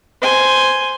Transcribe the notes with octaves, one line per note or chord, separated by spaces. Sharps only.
C5 G#5